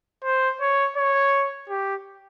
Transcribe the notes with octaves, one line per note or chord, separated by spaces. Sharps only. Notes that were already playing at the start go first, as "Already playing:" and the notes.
C5
C#5
C#5
G4